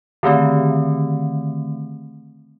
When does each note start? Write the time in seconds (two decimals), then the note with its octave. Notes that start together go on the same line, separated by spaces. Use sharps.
0.23 D3 D#3 A3 C4